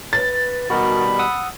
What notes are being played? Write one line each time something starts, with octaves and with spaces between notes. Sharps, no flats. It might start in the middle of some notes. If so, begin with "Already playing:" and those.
B4 A6
B2 D#3 G3 F#4 A#4 B5
F#5 D#6 E6